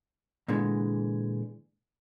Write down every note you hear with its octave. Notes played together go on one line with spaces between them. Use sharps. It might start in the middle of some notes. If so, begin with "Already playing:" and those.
A#2 D3 E3 G#3